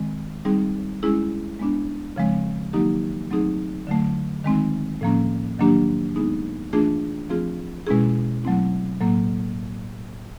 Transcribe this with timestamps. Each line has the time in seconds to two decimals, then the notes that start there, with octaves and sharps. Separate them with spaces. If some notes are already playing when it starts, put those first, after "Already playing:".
Already playing: D#3 G#3 C4
0.45 G3 C4 D#4 G#4
1.03 G#3 C#4 E4 G#4
1.59 G#3 B3 D4
2.16 C#3 F3 G#3 C4
2.73 D#3 F#3 A#3 D#4 G4
3.31 F#3 A3 C4 D#4 G#4
3.87 D3 F#3 A3
4.44 D#3 G#3 C4 D#4
5.01 A2 F3 A#3 C#4
5.59 D#3 F#3 A#3 D4 G4
6.16 G#3 B3 D#4 G#4
6.73 E3 A3 D4 F4 G#4
7.29 F3 A3 C4 F4 G#4
7.87 B2 G#3 C#4 E4 G#4
8.44 F#3 A3 C4 E4
9.01 A2 F#3 A#3